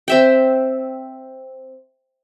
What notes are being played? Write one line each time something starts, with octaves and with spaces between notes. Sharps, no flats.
C4 E5 G5